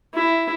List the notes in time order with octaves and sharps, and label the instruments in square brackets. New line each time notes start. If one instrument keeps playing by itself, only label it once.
[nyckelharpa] E4